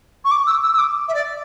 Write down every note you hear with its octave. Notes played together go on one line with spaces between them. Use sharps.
C#6
D6
E6
E6
E6
D6
E5
D5